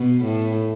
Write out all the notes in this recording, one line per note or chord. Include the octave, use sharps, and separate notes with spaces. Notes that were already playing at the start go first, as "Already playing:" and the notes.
Already playing: B2
A2